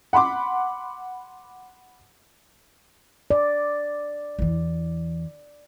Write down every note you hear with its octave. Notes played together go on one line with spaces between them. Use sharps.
F#5 B5 C6 D6
D5
E2 E3